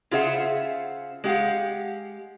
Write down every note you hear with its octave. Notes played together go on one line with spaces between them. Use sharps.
C#3 F4 G#4 C5 E5 F#5
G#3 G4 F5 F#5